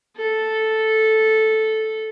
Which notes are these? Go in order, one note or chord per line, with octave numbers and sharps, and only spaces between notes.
A4